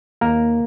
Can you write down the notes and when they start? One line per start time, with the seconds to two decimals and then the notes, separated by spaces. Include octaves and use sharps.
0.21 D#2 A#3 A#4